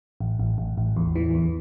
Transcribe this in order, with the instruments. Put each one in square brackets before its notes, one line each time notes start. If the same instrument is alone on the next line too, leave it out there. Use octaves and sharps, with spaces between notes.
[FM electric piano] A1
A1
A1
A1
E2
E3
E2